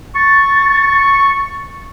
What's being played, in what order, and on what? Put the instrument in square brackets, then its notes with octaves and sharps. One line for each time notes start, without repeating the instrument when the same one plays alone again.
[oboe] C#6 [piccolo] A6